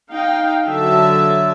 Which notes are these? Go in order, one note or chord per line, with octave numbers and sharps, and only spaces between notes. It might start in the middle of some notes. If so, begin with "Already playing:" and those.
D#4 F5 G5
D3 F#3 E5 A5